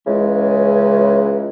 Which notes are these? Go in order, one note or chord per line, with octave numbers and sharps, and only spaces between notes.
C#2 C#3 E3 G#3